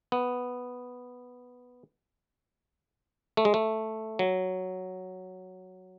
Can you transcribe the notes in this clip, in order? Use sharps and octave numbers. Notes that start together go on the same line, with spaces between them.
B3
A3
G#3
A3
F#3